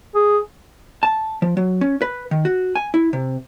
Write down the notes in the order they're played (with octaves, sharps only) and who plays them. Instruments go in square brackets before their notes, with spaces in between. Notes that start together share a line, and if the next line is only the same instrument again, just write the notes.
[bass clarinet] G#4
[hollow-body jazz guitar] A5
F3
F#3
C#4
B4
D#3
F#4
G#5
E4
C3